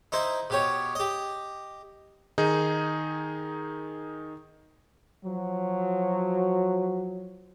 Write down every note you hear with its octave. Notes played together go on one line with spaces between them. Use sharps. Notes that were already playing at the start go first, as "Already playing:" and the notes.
D#4 E4 C5
B2 G4 C#5
G4 D#5
D#3 D#4 G#4
F3 F#3